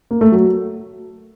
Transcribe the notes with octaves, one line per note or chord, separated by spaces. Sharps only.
A#3
A3
F#3